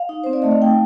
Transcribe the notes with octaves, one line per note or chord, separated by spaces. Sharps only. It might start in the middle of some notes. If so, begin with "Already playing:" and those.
Already playing: F5
D#4
C4 C5
D5
A3 D#5
F5
D#4 G5